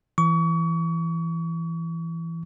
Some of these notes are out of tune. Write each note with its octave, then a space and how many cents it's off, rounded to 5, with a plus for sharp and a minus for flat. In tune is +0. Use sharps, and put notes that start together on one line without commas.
E3 +10 C#6 +35